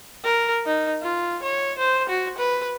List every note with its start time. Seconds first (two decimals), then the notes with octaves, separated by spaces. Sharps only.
0.24 A#4
0.67 D#4
1.02 F4
1.43 C#5
1.79 C5
2.09 F#4
2.38 B4